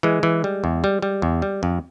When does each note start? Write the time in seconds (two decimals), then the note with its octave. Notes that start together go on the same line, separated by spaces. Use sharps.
0.03 E3 G#3
0.23 E3
0.44 G3
0.64 E2
0.84 G3
1.02 G3
1.22 E2
1.42 G3
1.63 F2